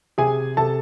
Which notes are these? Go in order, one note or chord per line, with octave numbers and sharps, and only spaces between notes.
C3 G#4 G#5
C3 A4 A5